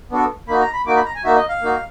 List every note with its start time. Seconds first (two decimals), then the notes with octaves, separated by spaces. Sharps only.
0.11 B3 D4 F#4 A4
0.48 A#3 D#4 F#4 B5
0.61 A#5
0.73 B5
0.86 A#3 D#4 F#4 D6
0.96 B5
1.06 A#5
1.15 G#5
1.24 A#3 D#4 F#4 E5
1.36 D#5
1.49 F5
1.61 A#3 D#4 F#4